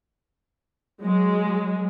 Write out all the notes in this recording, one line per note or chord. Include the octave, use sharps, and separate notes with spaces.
F#3 G#3